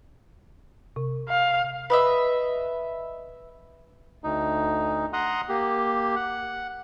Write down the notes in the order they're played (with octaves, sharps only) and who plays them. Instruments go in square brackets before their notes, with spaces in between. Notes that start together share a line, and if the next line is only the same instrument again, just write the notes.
[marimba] C3
[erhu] F5
[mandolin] B4 D#5 E5
[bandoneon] D2 D#4
F#5 A#5 C6 D#6
A#3 G4
F#5